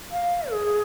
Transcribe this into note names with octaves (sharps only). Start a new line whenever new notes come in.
F5
G#4